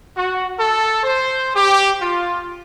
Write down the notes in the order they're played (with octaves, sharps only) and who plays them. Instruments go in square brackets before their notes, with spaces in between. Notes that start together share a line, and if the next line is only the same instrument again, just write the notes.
[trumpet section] F#4
A4
C5
G4
F4